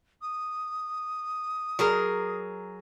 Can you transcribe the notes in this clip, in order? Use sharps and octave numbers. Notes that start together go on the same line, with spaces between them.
D#6
F#3 G#4 A#4